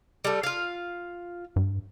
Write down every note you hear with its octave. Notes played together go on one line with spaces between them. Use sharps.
G3 A3
F4 F5
G2